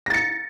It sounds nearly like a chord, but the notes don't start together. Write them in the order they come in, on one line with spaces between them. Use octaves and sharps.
A#6 A6 C#7